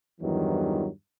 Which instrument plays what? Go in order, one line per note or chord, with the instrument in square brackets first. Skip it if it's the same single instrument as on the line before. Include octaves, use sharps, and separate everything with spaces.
[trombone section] E2 G2 D#3 E3 F#3